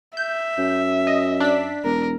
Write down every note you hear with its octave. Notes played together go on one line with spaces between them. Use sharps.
E5 G6
F#2
D#5
D4 B6
E1 A#4